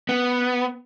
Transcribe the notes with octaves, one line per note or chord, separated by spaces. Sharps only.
B3